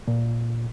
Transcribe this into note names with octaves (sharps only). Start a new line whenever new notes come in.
A#2